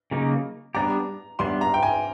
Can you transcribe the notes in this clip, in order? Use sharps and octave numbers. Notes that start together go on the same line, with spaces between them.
C#3 F#3 A#3 D#4
G3 B3 D4 G4 A#5
G3 B3 D4 C6
A#5
G5
G#5